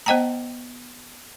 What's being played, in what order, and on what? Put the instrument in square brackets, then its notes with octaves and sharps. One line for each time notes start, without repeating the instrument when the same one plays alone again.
[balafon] B3 C5 D#5 G5 A5 A#5